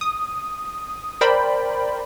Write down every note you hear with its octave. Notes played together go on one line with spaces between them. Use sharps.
D#6
A#4 C5 D5 G5 B5